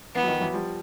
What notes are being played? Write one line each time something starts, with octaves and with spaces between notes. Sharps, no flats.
E3 B3
F#3
D#3 F3
E3 F#3
F3 G3